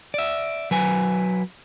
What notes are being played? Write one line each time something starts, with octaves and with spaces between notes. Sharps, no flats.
D5 E5
F#3 B4 G#5